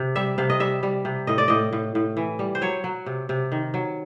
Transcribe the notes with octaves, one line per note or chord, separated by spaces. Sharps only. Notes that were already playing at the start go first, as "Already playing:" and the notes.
Already playing: C3
G3 E5
C3 F5
D#5
G3 E5
G3
C3
A2 D#5
D5
A2 D#5
A2
A2
E3
G3
C5
F#3 C#5
F#3
C3
C3
D#3
F#3